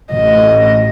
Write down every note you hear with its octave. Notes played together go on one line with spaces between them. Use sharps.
A1 D#5